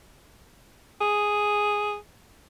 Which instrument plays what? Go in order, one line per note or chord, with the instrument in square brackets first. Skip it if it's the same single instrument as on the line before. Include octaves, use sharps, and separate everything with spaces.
[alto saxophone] G#4